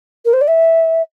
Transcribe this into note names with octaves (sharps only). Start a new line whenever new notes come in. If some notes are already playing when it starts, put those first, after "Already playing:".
A#4
C5
D5
E5